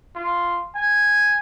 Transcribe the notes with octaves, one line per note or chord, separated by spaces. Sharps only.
F4
G#5